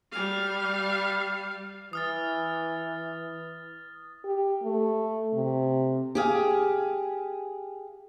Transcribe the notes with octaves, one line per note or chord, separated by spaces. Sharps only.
G3 F5
E3 D#6 F6 A6
G4
A3
C3
G4 G#4 F5